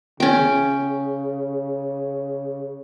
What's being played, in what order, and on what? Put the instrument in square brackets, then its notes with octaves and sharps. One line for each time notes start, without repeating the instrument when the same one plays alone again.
[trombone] C#3 [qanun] C#4 G5